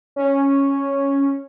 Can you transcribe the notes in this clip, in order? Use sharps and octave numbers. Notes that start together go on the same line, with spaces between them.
C#4